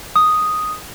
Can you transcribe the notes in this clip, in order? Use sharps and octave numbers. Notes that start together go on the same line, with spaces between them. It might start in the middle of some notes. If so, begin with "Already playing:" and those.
D#6